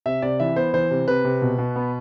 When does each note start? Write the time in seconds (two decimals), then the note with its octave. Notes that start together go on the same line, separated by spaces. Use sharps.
0.06 C3 E5
0.22 C3 D5
0.40 E3 E5
0.56 B3 C5
0.74 E3 C5
0.91 C3
1.08 C3 B4
1.24 C3
1.42 B2
1.58 B2
1.76 B3